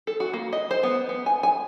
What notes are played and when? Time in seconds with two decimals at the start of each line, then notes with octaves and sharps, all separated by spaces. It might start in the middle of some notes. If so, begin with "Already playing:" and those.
0.07 A4
0.20 F#4
0.33 A#3
0.53 D#5
0.71 C5
0.83 B3
1.09 B3
1.26 G#5
1.43 G#5